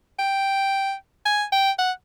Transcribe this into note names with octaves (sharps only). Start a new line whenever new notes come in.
G5
G#5
G5
F#5